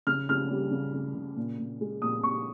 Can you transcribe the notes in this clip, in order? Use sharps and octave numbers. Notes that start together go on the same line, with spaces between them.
C#3 F6
C#3 F6
G3
C#3
C#3
C#3
A#2
A#2
G#3
A#2 D#6
A#2 C#6